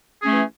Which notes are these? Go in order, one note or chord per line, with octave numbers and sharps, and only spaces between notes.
E3 A3 C#4 G#4